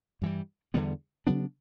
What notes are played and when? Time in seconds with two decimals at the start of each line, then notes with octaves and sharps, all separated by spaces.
0.22 G2 E3 G3
0.74 E2 D3 G3 B3
1.27 C#3 F#3 B3 D4